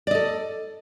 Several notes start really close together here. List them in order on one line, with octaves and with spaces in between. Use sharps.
D5 D#5 A4